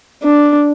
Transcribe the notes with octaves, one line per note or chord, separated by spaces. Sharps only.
D4